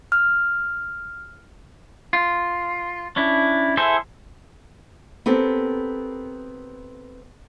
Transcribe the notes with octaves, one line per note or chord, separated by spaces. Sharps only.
F6
F4
C#4 D4 E4
E4 G#4 A4 C5 E5
B3 C4 G4 A4 A#4